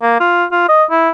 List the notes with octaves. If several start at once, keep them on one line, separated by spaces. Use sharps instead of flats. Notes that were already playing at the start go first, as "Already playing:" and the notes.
A#3
F4
F4
D#5
E4